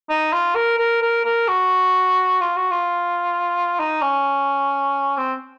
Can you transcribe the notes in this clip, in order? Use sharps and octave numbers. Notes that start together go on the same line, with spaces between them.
D#4
F4
A#4
A#4
A#4
A#4
F#4
F4
F#4
F4
D#4
C#4
C4